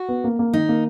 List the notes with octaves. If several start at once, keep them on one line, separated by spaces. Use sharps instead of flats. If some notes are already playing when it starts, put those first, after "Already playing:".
Already playing: F#4
B3
A#3
A#3
D#3 D#4
A#3